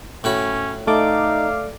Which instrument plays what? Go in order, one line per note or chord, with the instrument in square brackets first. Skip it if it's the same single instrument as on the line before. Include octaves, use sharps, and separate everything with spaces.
[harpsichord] A2 F#4 B5 [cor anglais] C#4
[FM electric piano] A3 D5 D6 [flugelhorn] D#4 [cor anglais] F5